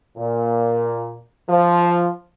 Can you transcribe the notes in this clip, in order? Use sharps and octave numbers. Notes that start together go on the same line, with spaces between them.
A#2
F3